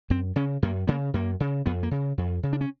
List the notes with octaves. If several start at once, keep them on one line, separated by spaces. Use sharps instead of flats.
F#2 C4
C#3 C#4
F#2 A#3
C#3 A#3
F#2 A#3
C#3
F2 B3
A#3
C#3
F2
C#3
D4
C#4